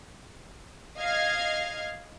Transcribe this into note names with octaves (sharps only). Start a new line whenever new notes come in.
D#5 F5 F6 G#6 C7